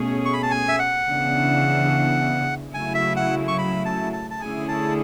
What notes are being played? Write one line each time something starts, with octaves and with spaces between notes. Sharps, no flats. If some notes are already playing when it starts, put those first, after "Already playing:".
Already playing: B2 A3 C#4 G#4
C#6
B5
A5
G#5
E5
F#5
C#3 E3 B3 D4
C#3 F#3 A3 E4 G#5
E5
F#5
C#6
B5
A5
A5
A5
D3 A3 C#4 E4 G#4 G#5
A5